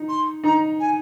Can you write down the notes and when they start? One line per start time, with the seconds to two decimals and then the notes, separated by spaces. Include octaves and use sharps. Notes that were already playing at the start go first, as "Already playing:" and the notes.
Already playing: D#4
0.09 C6
0.43 D#4 A#5
0.80 G#5